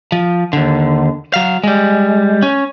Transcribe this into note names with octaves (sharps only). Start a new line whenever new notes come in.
F3
D#2 D3
F#3 F5
G3 G#3
C#4